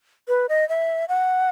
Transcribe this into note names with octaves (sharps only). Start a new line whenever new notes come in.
B4
D#5
E5
F#5